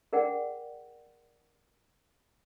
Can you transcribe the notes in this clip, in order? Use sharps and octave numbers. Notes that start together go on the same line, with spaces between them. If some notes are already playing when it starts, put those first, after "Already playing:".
G#4 A#4 D5 F#5 G5